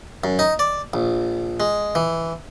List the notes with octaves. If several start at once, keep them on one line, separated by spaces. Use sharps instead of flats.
F#2
D#4
D5
A#1
G#3
E3